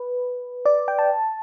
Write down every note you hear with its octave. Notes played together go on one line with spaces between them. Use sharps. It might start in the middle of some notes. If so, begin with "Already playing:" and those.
Already playing: B4
D5
G5
A5